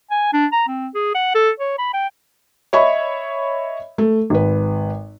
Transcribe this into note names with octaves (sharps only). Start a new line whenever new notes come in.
G#5
D4
A#5
C4
G#4
F#5
A4
C#5
B5
G5
C#5 D#5 E5 B5 C#6
A3
G#1 B4